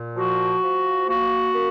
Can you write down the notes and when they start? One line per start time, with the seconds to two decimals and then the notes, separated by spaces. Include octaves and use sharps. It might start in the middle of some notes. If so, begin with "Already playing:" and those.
Already playing: A#2
0.16 F3 F#4
0.61 F3
1.07 A#3 F#4
1.53 A#3